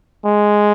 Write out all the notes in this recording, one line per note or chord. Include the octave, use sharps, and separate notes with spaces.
G#3